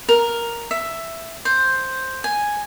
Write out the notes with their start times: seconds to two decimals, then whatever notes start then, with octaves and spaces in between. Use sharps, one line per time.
0.09 A#4
0.71 E5
1.45 C5
2.24 G#5